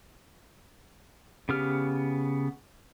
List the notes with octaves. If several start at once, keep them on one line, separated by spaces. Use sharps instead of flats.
C#3 B3 G4 F6